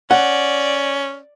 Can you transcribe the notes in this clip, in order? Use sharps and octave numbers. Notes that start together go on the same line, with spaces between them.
C#4 D5 F#5